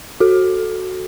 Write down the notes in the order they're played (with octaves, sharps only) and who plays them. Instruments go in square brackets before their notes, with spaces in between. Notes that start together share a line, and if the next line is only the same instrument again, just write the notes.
[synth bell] F#4 A4